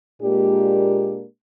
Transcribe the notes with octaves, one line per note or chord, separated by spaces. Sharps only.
A#2 G#3 A#3 D4 G4